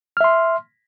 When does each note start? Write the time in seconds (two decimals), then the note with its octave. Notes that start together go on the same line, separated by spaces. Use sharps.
0.17 F6
0.21 E5
0.24 C6